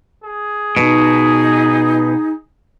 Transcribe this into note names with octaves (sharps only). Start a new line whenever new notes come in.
G#4
B2 D#4